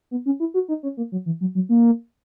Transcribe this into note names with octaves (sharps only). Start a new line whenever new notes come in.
B3
C#4
E4
F#4
D#4
C#4
A#3
F#3
E3
F#3
F#3
A#3